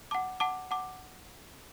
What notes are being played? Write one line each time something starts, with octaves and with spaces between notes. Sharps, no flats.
F#5 A5 D6
F#5 A5 D6
F#5 A5 D6